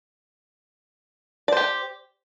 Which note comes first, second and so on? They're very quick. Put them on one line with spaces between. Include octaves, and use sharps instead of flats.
D5 C5 G4